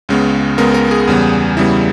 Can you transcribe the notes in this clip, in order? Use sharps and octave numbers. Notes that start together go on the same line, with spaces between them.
C#2 C#3 G#3 B3
C#2 C#3 G#3 B3 A#4
A#4
G#4
E2 C#3 G3 B3
E2 C#3 G3 B3 E4